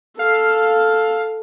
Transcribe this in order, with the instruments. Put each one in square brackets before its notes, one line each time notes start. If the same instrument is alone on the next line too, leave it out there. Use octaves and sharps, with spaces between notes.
[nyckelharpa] A4 [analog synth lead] F5